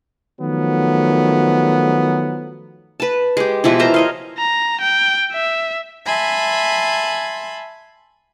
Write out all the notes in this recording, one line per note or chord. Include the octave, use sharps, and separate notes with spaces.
D#3 F3 F#3 A3 B3
B4 A5
G#3 G4
B2 E3 F3 E4
A#4 C5 A5 A#5
C#5 D#5 F5
A#5
G5
E5
E5 G#5 A5 B5 C6